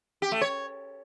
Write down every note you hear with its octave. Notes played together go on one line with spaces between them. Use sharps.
G4
A3
C#5